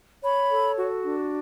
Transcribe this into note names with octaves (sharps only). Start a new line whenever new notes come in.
C#5 B5
A4
F#4
D4